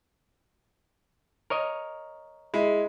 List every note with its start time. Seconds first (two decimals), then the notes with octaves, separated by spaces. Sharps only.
1.50 A#4 C#5 D#5
2.54 G#3 E4